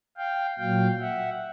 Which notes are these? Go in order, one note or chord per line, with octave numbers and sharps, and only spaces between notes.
F5 G5
A#2 F#3 F5 G5
E5 F#5